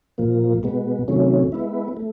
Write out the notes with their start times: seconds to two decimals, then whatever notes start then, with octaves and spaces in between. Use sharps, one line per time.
0.18 A#2 F3 A#3
0.63 B2 G#3 B3
1.08 C3 D#3 F#3 A3 C#4
1.52 G#3 B3 E4
1.97 A3